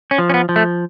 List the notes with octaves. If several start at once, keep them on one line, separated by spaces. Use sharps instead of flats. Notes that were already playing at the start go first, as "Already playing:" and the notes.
C#4
F3
C#4
B3
F3
A3